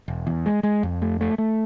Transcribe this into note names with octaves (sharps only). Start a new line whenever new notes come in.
E1
E2
G#3
G#3
F2
A3
A3
A3